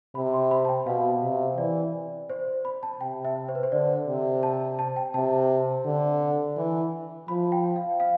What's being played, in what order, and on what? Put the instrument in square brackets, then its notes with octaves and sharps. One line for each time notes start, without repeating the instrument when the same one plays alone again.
[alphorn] C3 [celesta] B5
[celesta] C6
B5
A5
G5
[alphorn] B2 [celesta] F5
[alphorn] C3
[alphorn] E3 [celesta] D5
[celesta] C5
B5
A5
[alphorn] C3 [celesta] G5
[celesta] E5
C5
B4
C5
[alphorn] D3 [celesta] D5
[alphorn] C3
[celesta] A5
A5
G5
[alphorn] C3 [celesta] A5
[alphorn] D3
E3
[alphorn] F3 [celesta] B5
[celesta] G5
F5
F5